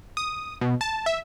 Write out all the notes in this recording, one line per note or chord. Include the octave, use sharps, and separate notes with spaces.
D#6
B2
A5
E5